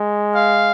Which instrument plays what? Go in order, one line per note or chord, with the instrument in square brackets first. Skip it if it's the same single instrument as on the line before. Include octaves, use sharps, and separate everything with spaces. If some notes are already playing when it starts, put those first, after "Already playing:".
Already playing: [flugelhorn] G#3
[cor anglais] F5